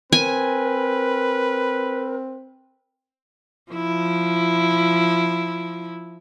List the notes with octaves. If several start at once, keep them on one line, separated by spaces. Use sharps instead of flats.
C4 A#4 B4 G#5
F3 E4